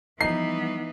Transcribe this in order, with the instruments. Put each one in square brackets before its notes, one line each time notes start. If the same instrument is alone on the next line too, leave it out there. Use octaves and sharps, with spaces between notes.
[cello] E3 B3 [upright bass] F3 G3 [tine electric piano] D#4 [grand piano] C7